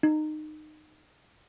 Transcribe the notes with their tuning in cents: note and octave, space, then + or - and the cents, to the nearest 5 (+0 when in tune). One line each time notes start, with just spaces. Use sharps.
D#4 -20